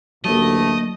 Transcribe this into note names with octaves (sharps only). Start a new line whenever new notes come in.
A1 D2 F#3 A3 A#3 D#5